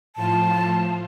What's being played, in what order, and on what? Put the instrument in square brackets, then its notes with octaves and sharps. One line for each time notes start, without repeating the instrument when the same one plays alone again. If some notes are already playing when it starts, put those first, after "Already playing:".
[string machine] A2 F3 F4 [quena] A5